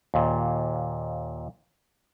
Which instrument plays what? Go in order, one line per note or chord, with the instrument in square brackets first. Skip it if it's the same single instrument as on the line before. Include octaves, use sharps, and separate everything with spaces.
[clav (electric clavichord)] D#2 A#2